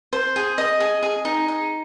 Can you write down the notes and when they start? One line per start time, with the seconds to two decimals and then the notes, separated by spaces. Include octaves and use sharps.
0.13 C5
0.36 G#4
0.58 D#5
0.80 G#4
1.03 G#4
1.25 D#4
1.48 D#4